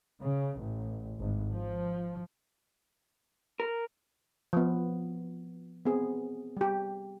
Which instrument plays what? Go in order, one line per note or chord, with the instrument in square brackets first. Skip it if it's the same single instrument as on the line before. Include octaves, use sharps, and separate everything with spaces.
[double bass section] C#3
A1
G#1
F3
[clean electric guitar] A#4
[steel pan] F3 B3
B3 C4 G#4
G3 G4